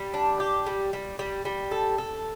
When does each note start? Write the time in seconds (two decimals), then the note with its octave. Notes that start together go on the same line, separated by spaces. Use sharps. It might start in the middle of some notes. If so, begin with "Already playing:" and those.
Already playing: G3
0.14 D4
0.40 G4
0.66 G3
0.93 G3
1.19 G3
1.45 G3
1.71 A4
1.98 A4